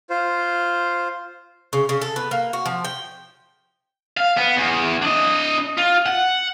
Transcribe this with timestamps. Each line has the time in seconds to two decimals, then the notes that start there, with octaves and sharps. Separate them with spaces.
0.10 F4 C5
1.73 C#3
1.89 C#3
2.02 A4
2.16 B3
2.31 A#3
2.53 F#4
2.66 F3
2.84 G5
4.17 F5
4.37 B3
4.56 E2
5.02 D4 D#5
5.78 F4
6.06 F#5